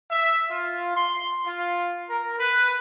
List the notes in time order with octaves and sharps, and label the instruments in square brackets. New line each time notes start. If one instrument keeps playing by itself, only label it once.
[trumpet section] E5
F4
C6
F4
A#4
B4